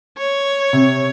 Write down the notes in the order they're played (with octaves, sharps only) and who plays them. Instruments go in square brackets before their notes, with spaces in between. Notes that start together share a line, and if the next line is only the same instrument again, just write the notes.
[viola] C#5
[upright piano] C3